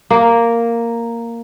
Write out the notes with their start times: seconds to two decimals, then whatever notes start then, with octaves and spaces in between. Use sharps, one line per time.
0.10 A#3